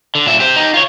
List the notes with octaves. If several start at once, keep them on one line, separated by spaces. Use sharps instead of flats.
D3
A#2 E5
G4 C5
D#4 G4
F4 C#5